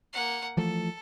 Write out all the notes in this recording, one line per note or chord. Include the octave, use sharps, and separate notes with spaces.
A#3 F#5
E3 F3 A3 A4